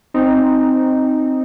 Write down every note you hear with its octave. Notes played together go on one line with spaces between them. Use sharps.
C4 D#4